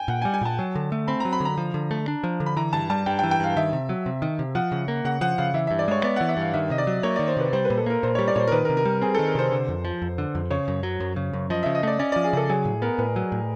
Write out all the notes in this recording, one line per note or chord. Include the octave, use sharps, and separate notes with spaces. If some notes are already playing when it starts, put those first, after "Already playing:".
Already playing: G5 G#5
A#2 F#5
G#5
G3
G#5
A#2 A5
F#3
D3
A3
C4 B5
F#3 A#5
B5
D3 A#5
F3
D3
A3
D4
F3
D3
B5
E3 A#5
G2 A5
G3 A5
G2 G5
G5
E3
G5
G2 F5
D#3 E5
C3
F#3
C3
D#3
C3
F3 F#5
C#3
A#3
C#3 F#5
F3 F#5
C#3 F5
E3 E5
G2 E5
D5
G#3 C#5
B3 D5
E3 F#5
E5
G2 F5
D#3 E5
C3 D#5
D5
F#3
A#3 C#5
D#3 D5
C5
C3 B4
G3 C5
B4
A#2
A4
A#3 A#4
A#2 C5
G3 C#5
D5
A#2 C5 C#5
A#4
D#3 B4
A#4
C3
A#4
G3
C4 G#4
D#3 A4
A#4
C3 C5
D3
F2
F3
F2
D3
F2
C#3 C#5
F#2
F#3
F#2
C#3
F#2
F3 D#5
C#3 E5
D#5
A3 D5
C#4 D5
F3 D5
G#4
C#3 A4
F#3 G#4
A2
B3 A#4
A2 B4
F#3
A2